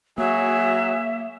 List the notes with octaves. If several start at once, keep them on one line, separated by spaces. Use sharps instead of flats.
F#3 A#3 G#4 E5